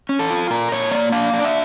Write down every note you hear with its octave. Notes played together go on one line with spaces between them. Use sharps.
C#4
A4
F4
A#2 A#4
A#2 C#5
A#3 D5
D4 F5
D4
D5
E5